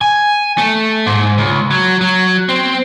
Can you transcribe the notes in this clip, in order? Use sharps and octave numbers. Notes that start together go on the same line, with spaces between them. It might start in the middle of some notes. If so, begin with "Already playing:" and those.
G#5
A3
G#2
C#2
F#3
F#3
C4